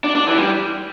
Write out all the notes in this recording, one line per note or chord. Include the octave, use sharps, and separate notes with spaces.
D4
D4
E3
G3